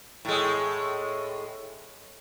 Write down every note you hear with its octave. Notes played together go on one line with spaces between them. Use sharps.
A2 G#3